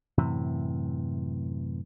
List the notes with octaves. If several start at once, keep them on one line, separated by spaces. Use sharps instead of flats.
F#2 A2 C3 E3